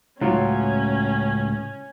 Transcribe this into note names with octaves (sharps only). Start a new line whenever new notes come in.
C#2 A2 F#3 C#4 F4